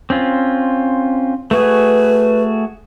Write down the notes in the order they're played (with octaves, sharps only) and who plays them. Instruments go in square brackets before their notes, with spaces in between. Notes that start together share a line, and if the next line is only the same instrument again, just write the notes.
[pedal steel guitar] C4 C#4 F4
[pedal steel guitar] A3 F#4 G#4 [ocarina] B4